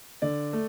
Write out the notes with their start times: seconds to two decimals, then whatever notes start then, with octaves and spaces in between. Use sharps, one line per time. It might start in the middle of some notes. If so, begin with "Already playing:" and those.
0.22 D3 D5
0.53 A3